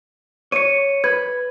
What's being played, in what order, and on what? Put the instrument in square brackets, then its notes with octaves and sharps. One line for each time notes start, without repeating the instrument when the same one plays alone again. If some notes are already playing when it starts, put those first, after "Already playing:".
[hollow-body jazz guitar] C#5 [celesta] C#7 D#7
[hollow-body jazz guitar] B4 [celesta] G#6